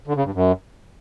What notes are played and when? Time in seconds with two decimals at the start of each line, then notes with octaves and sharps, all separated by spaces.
0.07 D3
0.16 C#3
0.25 G2
0.34 F#2